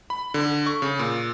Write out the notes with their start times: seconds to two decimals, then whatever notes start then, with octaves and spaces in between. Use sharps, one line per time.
0.10 B5
0.34 D3
0.66 C#6
0.82 C#3
0.99 A#2